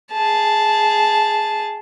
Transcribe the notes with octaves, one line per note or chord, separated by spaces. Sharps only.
G#4 A5